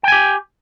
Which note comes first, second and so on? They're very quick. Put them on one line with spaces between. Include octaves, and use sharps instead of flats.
G5 G#5 G4